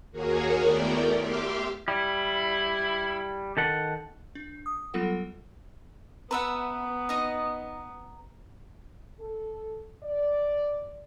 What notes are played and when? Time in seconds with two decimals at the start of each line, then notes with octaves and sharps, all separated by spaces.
0.12 D#2 A#3 F#4 G#4 A#4 C#5
0.62 A3 B3 E4 A#4 D5 G5
1.18 G4 E5 C6 D6 F6
1.88 G3 E4
3.57 D#3 A4 F#5
4.35 D4
4.66 D#6
4.94 F#3 G3 B3 F4 A4 F#5
6.31 B3 B4 E5 F#5 A#5
7.09 D#4 D#5
9.20 A4
10.03 D5